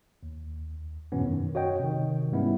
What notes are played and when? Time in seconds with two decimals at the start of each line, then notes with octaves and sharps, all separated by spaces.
0.23 D#2
1.12 E2 G#2 B2 E3 B3 C#4
1.26 F#2 D#3
1.55 F#4 C#5 D#5 G5
1.80 C3 D#3
2.32 G#2 G3 G#3 B3 C#4 E4